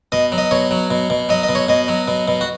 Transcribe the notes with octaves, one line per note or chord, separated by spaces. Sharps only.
B2 D#5
F#3
D#5
B2 C#5
F#3
B2
B2
F#3 D#5
D#5
B2
C#5
B2 D#5
F#3
B2
B2
F#4